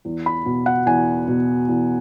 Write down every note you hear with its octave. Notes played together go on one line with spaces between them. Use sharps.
E2
B5
B2
F#5
E2 G#5
B2
E2